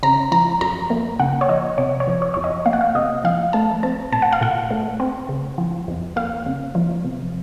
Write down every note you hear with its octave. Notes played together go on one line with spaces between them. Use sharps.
C#3 A#5
F3 A#5
F#2 A#5
A#3
C#3 F#5
C#5
F3 D#5
C3 C#5
C#5
F3
C#5
F2 C#5
D#5
A#3 F5
F#5
F5
C3 D#5
F3 F5
A3 A5
C4 A5
A#2 A5
F#5
F5
A#2 F#5
A3
C4
C#3
F3
F2
A#3 F5
C#3
F3
C3